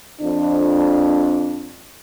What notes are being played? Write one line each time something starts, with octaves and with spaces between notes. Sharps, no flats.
F2 D4